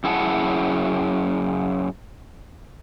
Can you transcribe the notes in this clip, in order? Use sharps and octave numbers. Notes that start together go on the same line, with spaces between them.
F#2 E4 G#4 F#5 A5